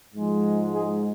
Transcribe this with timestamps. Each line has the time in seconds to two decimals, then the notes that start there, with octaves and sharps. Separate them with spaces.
0.14 G#2 F3 G#3
0.74 G#4